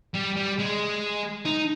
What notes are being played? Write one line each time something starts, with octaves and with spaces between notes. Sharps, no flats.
G3
G3
G#3
D#4